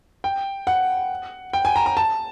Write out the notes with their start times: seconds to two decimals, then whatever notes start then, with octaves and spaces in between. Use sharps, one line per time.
0.24 G5
0.67 F#5
1.53 G5
1.65 G#5
1.76 A#5
1.86 A#5
1.97 A5